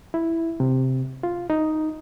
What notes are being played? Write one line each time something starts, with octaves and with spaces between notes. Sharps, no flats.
E4
C3
F4
D#4